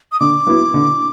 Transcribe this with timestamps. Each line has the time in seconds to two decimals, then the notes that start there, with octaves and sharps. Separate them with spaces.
0.12 D#6
0.20 D3 D6
0.47 F#3 B3 E4
0.74 D3